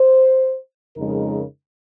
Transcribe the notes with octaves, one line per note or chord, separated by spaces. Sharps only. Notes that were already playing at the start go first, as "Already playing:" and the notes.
Already playing: C5
F2 C#3 G#3 D#4 A#4